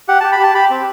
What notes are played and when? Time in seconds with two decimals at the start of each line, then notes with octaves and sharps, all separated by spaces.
0.08 G4 F#5
0.20 G4 A5
0.32 B5
0.39 G4 A5
0.55 G4 B5
0.70 C4